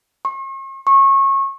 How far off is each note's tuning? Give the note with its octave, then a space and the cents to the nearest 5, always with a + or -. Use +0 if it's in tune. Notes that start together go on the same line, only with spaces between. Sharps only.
C#6 -45
C#6 -25